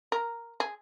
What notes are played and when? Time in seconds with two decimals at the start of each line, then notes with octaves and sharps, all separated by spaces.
0.12 A#4
0.60 G#4